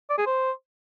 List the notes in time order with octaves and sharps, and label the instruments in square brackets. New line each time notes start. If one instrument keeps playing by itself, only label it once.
[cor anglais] D5
G#4
C5